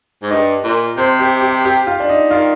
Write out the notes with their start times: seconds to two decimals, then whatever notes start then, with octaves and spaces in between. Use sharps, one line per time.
0.23 G#2
0.31 G2 D#5
0.64 A#2
0.97 C3 C5
1.20 G4
1.42 G4
1.65 G4
1.87 F4
2.00 D4
2.09 D#4
2.30 D#3 F4